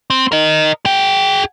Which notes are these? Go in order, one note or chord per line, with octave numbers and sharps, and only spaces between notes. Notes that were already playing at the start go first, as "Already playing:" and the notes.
C4
A#4 D#5
G#4 G5